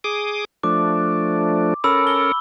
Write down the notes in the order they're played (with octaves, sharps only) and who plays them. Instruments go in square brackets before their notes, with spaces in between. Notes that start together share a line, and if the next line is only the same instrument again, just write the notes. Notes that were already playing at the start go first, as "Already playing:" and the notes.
[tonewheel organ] G#4 D6 D#6
[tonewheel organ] F3 A3 D4 [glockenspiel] D6
[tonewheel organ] C#4 A4 A#4 [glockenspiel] B5 E6
[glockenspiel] G7